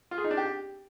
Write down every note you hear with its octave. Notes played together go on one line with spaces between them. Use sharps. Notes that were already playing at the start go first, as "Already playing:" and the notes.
F4
G#4
D#4
D4
G4